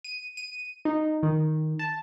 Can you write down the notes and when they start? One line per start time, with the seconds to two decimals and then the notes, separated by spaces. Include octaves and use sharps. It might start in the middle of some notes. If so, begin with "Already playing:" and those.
0.04 D#7
0.37 D#7
0.85 D#4
1.23 D#3
1.79 A5